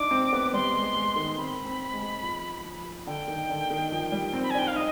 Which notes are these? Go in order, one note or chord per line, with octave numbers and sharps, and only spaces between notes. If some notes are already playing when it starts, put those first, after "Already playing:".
Already playing: D4 D#4 D6
C4
B3
G3 C6
G#3
G#3
D#3
C4 B5
C4
G#3
F3
F3
D3 G5
D#3
D3
D#3
F3
G3
C4
B5
G#5
D4 G5
F5
D#4 D#5